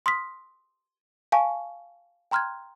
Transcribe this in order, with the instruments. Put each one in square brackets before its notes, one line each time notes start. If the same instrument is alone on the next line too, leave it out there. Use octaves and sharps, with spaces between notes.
[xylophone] C6 D#6 F6 B6
F5 G#5 A5 C#6
G5 A#5 C6 F6 F#6 G#6